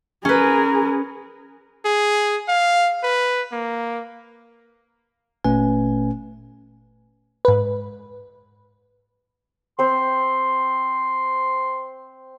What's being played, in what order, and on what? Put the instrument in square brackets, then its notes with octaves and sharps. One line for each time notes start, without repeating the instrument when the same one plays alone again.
[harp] C#4 B4 [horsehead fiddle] G#4 A#4
[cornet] G#4
F5
B4
A#3
[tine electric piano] G1 A#2 A3 C#4 B4 G#5
[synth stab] G#2 B4
[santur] C4 C5 [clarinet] C6